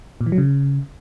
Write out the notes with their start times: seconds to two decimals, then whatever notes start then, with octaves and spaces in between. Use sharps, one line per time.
0.21 A#2
0.26 E3
0.32 F#3
0.38 C#3